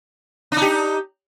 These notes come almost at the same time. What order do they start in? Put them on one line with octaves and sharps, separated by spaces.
D4 D#4 G4